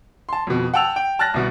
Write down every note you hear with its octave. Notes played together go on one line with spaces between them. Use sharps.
A5 C6
F2 B2
F#5 G5 A5 E6 F7
G5
A5 F6 F#6 A6 A#6
C2 B2 B3